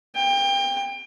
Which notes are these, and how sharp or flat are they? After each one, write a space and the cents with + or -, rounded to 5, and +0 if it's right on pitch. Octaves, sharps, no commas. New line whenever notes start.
G5 +30